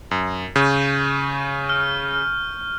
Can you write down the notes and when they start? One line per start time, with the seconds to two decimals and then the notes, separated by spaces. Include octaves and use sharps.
0.11 F#2
0.56 C#3 C#6 G6
1.69 F6